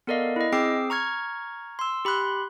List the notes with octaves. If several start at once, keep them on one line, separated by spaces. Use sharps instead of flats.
B3 A4 A#4 D5 D#5 F5
E4 D#5
C4 G#4 G5 D6 E6 C7
A#5 C#6 F6 G#6
C6 E6
G4 B5 C6 F#6